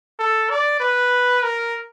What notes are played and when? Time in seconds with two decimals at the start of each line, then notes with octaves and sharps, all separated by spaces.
0.19 A4
0.50 D5
0.80 B4
1.43 A#4